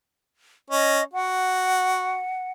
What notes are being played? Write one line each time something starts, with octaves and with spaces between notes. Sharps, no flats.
C#4 D#5
F#4 F#5